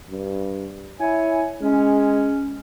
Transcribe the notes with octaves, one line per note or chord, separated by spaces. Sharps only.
G2
E4 C#5 G#5
G#3 C#4